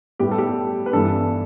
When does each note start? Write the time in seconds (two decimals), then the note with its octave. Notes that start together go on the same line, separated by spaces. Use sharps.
0.19 A2 G3 B3 G4
0.31 A4
0.38 G4
0.86 B4
0.93 G2 E3 B3 A4